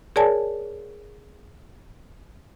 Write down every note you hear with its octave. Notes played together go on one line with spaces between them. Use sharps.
G#4 A#4 C#5 D5 G#5 A5